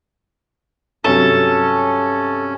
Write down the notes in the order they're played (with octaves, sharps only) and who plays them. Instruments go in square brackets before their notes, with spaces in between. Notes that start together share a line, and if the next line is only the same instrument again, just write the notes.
[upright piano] G2 C3 F#3 [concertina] C#4 [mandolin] A4